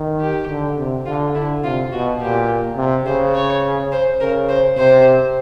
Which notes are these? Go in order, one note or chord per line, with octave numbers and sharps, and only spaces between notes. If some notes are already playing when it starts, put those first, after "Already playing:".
Already playing: D#3
G4
D3
C3
D3 F4
D3 E4
C3 F4
B2 F#4
A#2 G4
C3
C#3 C5
C#5
C5
C#3 A#4
C5
C3 C5